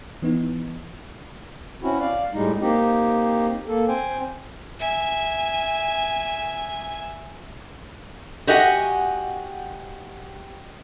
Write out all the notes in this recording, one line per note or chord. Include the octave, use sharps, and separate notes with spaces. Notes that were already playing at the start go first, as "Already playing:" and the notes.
E3 B3 D#4
C4 C#4 E4 F#4
D5 F5
A2 G3 G#3 D#4
A#3 C4 D#4 G4
A#3 A4
C4 C5 G5 G#5
E5 G#5
F#4 G4 D#5 F#5 G#5